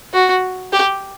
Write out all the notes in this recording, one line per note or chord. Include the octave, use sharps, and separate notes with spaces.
F#4
G4